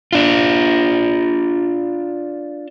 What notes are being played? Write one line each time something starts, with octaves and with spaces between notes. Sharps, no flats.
D4 F4